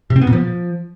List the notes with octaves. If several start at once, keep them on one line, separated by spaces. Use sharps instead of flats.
C3
C4
B3
A#2
F3